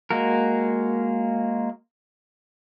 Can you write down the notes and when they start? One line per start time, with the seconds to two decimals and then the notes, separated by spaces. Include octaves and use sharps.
0.11 G#3 A#3 F#4 A#4